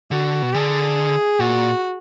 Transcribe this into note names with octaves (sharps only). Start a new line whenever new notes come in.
D3 F#4
B2
D3 G#4
A#2 F#4